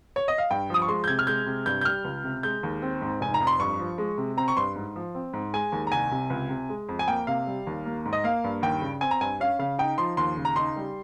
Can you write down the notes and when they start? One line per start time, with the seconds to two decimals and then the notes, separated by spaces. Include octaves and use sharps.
0.16 C#5
0.28 D#5
0.38 F5
0.51 G2 G5
0.70 F3 D#6
0.82 C#6
0.88 G#3 C6
1.04 G6
1.08 C3 G#6
1.19 F6
1.27 G#3 G6
1.46 C3
1.66 G2 G6
1.81 G6
1.85 G3 F6
2.04 C#2
2.24 C3
2.43 G#3 G6
2.63 D#2
2.82 C4
3.01 G#2
3.21 F1 G#5
3.34 A#5
3.40 F2
3.47 C6
3.60 G2 C#6
3.80 F3
3.98 G#3
4.18 C3
4.37 C4 A#5
4.48 C#6
4.57 G2 C6
4.76 G#2
4.96 F3
5.15 C4
5.33 G#2
5.54 G#3 G#5
5.72 D#2
5.87 A#5
5.92 C2 G#5
6.11 C3
6.30 C#2
6.50 C3
6.69 G#3
6.89 F2
6.99 G#5
7.08 A#3 G5
7.27 C3 F5
7.47 G3
7.67 D#2
7.85 A#3
8.05 G#2
8.13 D#5
8.24 A#3 F5
8.44 G2
8.62 D#2 G5
8.82 C#3
9.01 C4 G#5
9.11 A#5
9.21 G2 G#5
9.40 C#4 F5
9.59 C#3 F5
9.78 D#4 G5
9.98 F3 C6
10.17 D#2 C6
10.37 C#3
10.45 A#5
10.56 D#4 C6
10.76 G3